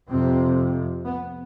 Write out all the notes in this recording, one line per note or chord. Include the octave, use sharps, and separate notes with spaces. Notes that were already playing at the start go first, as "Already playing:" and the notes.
F2 C3 C4
B3